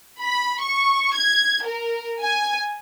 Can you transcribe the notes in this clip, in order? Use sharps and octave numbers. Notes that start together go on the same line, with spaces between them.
B5
C#6
G#6
A#4
G#5